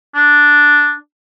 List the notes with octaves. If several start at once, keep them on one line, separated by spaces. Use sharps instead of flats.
D4